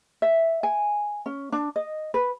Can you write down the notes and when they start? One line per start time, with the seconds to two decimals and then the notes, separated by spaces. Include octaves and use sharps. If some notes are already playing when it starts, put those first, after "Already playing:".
0.22 E5
0.63 G#5
1.26 C#4
1.52 D4
1.76 D#5
2.14 B4